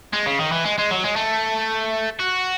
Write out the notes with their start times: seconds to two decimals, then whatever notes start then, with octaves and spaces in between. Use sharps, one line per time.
0.13 G#3
0.26 C#3
0.39 D#3
0.51 E3
0.65 G#3
0.78 G#3
0.91 F#3
1.03 G#3
1.16 A3
2.19 F#4